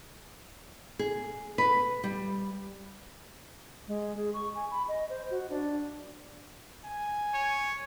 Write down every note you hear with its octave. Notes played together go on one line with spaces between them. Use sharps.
G#4
B4
G3
G#3
G#4
C#6
G#5
B5
D#5
C5
F#4
D4
G#5
C#5